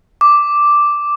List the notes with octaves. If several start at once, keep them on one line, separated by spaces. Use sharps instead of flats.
D6